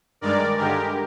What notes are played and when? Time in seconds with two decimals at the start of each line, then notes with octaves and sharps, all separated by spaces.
0.21 G2 D#3 G#3 A#4 D5
0.58 G2 D3 G#3 G4 A#4